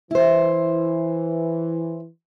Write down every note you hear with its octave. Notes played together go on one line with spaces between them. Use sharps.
E3 E4 C5